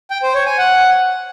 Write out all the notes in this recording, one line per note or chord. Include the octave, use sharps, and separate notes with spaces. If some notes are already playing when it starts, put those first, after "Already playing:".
G5
C5
C#5
G#5
F#5